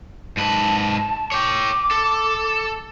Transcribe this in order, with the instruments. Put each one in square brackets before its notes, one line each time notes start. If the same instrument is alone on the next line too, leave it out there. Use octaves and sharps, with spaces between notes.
[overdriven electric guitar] G#2 B4 [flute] A5
[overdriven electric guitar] C#5 G5 [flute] D6
[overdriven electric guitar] A4